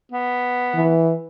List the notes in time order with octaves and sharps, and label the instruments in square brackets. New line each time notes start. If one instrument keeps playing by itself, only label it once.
[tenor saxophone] B3
[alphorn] E3